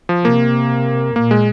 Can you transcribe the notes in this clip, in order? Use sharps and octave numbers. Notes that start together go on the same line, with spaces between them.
F3
C3 A#3
A#2 A#3
G#3